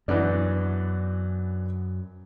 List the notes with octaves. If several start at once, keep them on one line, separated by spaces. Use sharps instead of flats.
F#2 E3 B3 D4